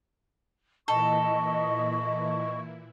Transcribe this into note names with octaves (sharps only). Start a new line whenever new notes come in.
A#2 E3 E4 A4 D#5 C#6